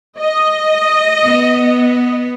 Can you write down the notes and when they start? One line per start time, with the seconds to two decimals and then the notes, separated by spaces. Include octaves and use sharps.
0.19 D#5
1.23 B3